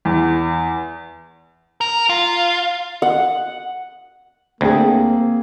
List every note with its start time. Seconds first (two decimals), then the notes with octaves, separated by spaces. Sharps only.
0.05 E2
1.81 A#4
2.09 F4
3.02 F#5
4.61 D2 A#3 C4 G#4